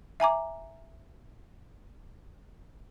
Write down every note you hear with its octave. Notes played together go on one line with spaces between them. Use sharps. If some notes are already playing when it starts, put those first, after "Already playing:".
E5 G#5 A#5 D6